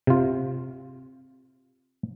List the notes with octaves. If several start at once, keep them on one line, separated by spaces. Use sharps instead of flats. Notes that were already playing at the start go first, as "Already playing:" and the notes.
C3 F4